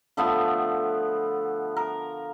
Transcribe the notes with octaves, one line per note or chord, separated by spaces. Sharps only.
D3 F3 A3 B3
A#4